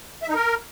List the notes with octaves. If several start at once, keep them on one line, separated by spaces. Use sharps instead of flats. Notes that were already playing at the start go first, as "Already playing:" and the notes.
E5
D#4
A#4